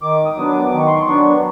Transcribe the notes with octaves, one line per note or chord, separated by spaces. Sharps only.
D#3 D6
D#6
F#3 B3 D4
D6
D#3 D6
C#6
C6
C#6
F#3 B3 D4